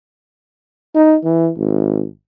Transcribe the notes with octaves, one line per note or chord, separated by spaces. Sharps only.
D#4
E3
G#1